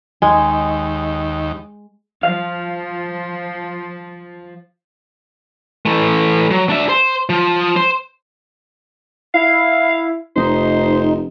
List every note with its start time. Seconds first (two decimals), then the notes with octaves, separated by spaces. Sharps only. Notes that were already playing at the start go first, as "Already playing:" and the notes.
0.22 D#2 G#3
2.23 F3 F5
5.86 E3 A3
6.51 F#3
6.69 D4 E5
6.89 C5
7.30 F3
7.76 C5
9.34 E4 F5
10.36 F1 D#4 C5